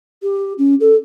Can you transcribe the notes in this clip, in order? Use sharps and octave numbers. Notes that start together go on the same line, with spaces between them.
G4
C#4
A4